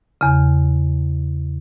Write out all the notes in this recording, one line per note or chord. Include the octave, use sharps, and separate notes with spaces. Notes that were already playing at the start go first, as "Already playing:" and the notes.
E2 C#3